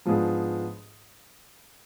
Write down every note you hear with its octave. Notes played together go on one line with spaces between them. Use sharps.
G#2 F3 B3 D4 G#4